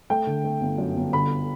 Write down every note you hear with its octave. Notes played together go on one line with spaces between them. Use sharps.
A3 G5
D3
A3
G1
F#2
G1
D3 B5